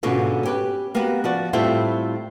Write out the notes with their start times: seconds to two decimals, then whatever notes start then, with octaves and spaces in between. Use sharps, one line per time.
0.03 G#2 B2 D3 C#4 F4
0.43 C#4 G4 B4
0.95 A#3 B3 F#4 G4 B4
1.24 F3 F#4 D5
1.53 A2 G3 A3 C4 E4 F4